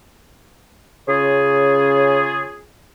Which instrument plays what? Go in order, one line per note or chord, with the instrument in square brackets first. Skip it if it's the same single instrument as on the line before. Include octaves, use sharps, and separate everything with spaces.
[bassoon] C#3 [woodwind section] C#4 F4 G#4